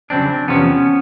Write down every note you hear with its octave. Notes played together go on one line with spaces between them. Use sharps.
F2 C#3 F#3 C4 D4
E2 C3 F3 B3 C#4